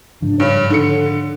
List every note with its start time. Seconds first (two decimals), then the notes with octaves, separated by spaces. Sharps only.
0.22 G#2 C#3 F3 D4
0.40 G2 C#5
0.70 D3 A4 C#7